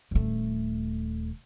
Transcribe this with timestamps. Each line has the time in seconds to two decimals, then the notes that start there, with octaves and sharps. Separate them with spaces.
0.11 D#1 A3